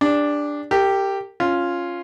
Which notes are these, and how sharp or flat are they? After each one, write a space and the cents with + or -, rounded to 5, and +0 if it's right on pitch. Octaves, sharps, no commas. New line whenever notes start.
D4 +0 G4 +45
G4 +0 A#4 -40
C#4 +0 F4 +0